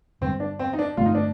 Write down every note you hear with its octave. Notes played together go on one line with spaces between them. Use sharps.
G2 D3 G3 C4
D4
C4
D#4
D4
G2 D3 A3 C4 F4
D#4
D4